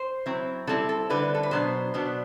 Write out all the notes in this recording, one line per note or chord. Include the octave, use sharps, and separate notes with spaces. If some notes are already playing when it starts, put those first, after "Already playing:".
Already playing: C5
F#3 C4 E4
D3 G3 C4 E4 A4
A4
D3 G3 C4 E4 B4
A4
B4
B2 F#3 B3 D4 C5
B2 F#3 B3 D4